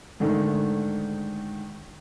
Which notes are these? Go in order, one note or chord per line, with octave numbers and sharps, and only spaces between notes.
G#2 D3 D#3 A3